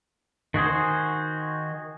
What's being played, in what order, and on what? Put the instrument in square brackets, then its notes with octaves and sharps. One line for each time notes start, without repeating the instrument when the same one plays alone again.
[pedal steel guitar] D#3 F#4 G#4 C5